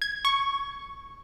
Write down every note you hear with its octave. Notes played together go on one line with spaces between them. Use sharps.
G#6
C#6